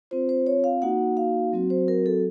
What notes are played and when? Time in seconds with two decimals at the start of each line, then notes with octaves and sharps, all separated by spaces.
0.11 C4 F4 C5
0.29 C5
0.46 C#5
0.64 F5
0.82 A#3 D#4 F#4 F#5
1.17 F5
1.53 F#3 C4 F#4
1.70 C5
1.88 A#4
2.06 A4